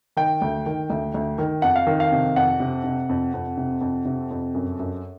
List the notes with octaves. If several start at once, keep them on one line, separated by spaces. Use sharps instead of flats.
D#3 G5
D2
D#3
D2
D2
D#3
F2 F#5
F5
D#3
F5
C3
F2 F#5
C3
C3
F2
F2
C3
F2
C3
F2
F#2
F#2